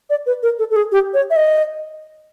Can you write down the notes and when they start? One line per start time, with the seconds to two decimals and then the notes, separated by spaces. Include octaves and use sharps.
0.10 D5
0.26 B4
0.43 A#4
0.59 A4
0.71 A4
0.76 G#4
0.92 G4
1.14 C#5
1.30 E5
1.36 D#5